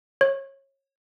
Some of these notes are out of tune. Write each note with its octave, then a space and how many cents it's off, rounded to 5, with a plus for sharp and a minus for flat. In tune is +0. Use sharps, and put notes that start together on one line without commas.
C#5 -25